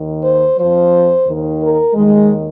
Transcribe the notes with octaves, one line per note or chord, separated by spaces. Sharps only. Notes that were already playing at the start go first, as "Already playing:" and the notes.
Already playing: D#2 D#3
C5
F2 F3 C5
D#2 D#3
A#4
D#2 D#3 G#3